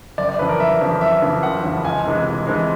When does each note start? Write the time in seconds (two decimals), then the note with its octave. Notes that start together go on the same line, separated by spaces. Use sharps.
0.18 F#1 D5
0.29 D5
0.39 F2 C#3 E3 B4
0.49 A#4
0.60 F#1 E5
0.80 F2 C#3 E3
1.01 F#1 E5
1.22 F2 C#3 E3
1.43 F#1 F#5
1.64 F2 C#3 E3
1.85 C#2 G#5
2.06 C3 E3 G#3
2.26 C#2
2.47 C3 E3 G#3